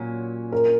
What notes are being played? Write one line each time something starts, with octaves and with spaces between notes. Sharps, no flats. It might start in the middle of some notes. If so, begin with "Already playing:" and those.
Already playing: A#2 F#3 C#4
A#4